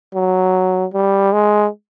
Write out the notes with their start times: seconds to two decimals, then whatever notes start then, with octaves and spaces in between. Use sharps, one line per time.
0.15 F#3
0.94 G3
1.32 G#3